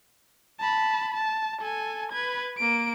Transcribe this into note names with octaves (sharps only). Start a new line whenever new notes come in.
A5 B5
A5
A4 G#5
B4 G#6
A#3 D7